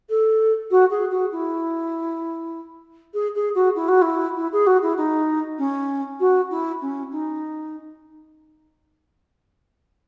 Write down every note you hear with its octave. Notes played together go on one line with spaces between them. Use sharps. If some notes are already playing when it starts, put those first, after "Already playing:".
A4
F#4
G#4
F#4
E4
G#4
G#4
F#4
E4
F#4
E4
E4
G#4
F#4
E4
D#4
C#4
F#4
E4
C#4
D#4